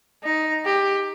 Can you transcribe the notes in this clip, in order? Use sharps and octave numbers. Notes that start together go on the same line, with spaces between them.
D#4
G4